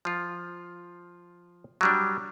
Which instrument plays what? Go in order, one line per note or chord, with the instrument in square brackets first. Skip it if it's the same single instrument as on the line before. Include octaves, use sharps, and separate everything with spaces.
[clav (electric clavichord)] F3 F4
F#3 G3 D4